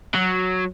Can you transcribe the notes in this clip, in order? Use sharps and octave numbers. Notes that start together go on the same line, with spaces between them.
F#3